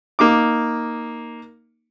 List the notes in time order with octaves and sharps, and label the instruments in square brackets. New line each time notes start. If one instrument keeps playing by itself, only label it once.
[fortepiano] A#3 D#4 D6